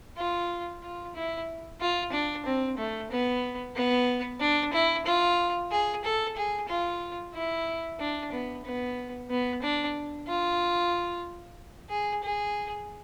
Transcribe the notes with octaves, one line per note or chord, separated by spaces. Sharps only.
F4
F4
E4
F4
D4
C4
A3
B3
B3
D4
E4
F4
G#4
A4
G#4
F4
E4
D4
B3
B3
B3
D4
F4
G#4
G#4